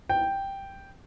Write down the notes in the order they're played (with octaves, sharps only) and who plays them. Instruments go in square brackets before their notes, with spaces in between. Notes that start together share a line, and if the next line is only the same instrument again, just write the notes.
[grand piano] G5